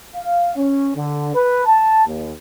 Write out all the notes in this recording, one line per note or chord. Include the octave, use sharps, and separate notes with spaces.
F5
C#4
D3
B4
A5
D#2